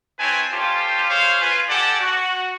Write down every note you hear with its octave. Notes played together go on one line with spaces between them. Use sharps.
C4 E4 B4 C#5 G#5 A5
C#4 F4 G4 A4 C5
G#4 C5 C#5 F5
F4 B4 G#5
G4 A4 D5 F#5 G#5 A5
F#4